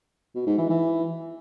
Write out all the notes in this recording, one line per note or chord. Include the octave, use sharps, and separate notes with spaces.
B2
G#2
E3
E3